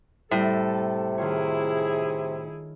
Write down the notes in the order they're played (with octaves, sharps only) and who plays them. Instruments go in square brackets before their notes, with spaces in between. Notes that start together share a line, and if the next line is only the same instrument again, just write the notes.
[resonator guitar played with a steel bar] A2 [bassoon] C3 [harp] G3 E5 F#6 [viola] A4
[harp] D#3 F4 C#5 [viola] E4 G#4